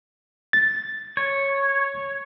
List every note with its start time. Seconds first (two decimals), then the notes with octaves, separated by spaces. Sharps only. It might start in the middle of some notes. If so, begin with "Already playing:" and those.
0.53 A6
1.17 C#5